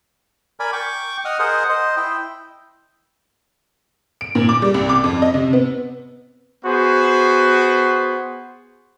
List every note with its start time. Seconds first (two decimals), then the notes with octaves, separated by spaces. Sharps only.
0.60 A#4 D5 G#5 B5
0.73 G5 C#6 D6
1.25 D#5 F#5 D#6 F6
1.39 G#4 A#4 C5 D#5 F#5
1.69 C5 D#5
1.97 E4 G5
4.21 D7
4.35 A#2
4.49 D6
4.62 G3
4.74 C2
4.89 D6
5.04 F2
5.22 D#5
5.34 C3
5.53 B3
6.65 B3 F#4 G#4 C5